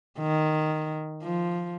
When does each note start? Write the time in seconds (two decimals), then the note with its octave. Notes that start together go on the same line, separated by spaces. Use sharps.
0.19 D#3
1.23 F3